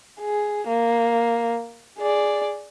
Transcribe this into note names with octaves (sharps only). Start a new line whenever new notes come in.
G#4
A#3
G#4 D5